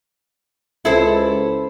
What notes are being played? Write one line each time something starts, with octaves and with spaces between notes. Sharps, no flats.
C#2 E4 A4 C5